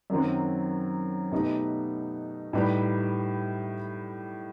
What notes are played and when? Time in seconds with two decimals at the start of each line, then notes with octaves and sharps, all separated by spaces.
0.10 F#2 D#3 F#3 C4
1.32 B2 A3 D#4 G4 B4
2.53 A2 G3 D#4 G4 B4